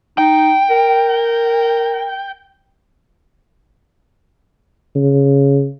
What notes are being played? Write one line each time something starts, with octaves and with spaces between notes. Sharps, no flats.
D#4 G5
A#4
C#3